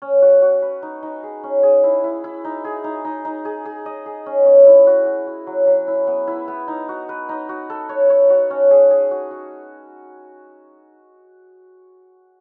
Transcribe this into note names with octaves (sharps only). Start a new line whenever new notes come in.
C#4
F#4
F#4
B4
D#4
D#4
G#4
C#4
G#4
E4
E4
E4
D#4
G#4
D#4
D#4
D#4
G#4
G#4
D#5
G#4
C#4
C#4
E4
F#4
F#4
F#4
F#3
F#3
E4
B3
E4
B3
D#4
F#4
B4
D#4
F#4
A4
C#5
C#5
F#4
C#4
G#4
G#4
F#4
F#4